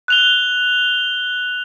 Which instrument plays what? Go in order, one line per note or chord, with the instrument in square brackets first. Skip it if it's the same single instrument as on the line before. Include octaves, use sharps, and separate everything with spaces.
[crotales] F#6 F7 G7